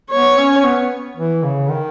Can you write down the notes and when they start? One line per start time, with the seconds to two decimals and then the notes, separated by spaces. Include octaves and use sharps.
0.11 B3 C#5
0.38 C#4
0.64 B3
1.17 E3
1.43 C#3
1.70 D#3